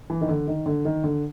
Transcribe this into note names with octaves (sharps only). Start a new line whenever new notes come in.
E3
D#3
D3
D#3
D3
D#3
D3